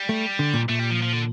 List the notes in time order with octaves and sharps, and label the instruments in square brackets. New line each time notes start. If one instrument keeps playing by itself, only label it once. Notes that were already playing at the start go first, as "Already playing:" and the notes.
Already playing: [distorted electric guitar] G3
[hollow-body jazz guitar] A3
D3
A#2
[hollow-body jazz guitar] A#2 [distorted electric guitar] A3
[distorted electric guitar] G3
F3
F3
D3